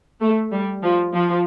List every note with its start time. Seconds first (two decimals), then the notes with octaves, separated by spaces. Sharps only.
0.21 A3
0.52 G3
0.83 F3
1.14 F3